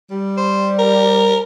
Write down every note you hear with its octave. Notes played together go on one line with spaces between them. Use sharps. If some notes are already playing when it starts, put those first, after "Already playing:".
G3
C5
A#4